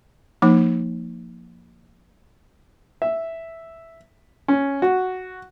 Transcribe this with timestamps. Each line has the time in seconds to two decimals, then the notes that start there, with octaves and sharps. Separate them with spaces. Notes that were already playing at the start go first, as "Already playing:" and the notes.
0.42 F3 A#3 D#4
3.02 E5
4.48 C#4
4.82 F#4